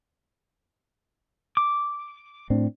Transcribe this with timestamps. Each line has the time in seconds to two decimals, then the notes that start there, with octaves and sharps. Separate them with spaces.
1.57 D6
2.50 A2 C4 D4